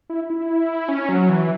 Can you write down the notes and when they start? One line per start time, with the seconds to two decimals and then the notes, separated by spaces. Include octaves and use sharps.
0.10 E4
0.30 E4
0.89 C#4
1.09 F#3
1.29 E3